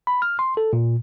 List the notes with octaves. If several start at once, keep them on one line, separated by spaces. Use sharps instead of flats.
B5
F6
C6
A4
A#2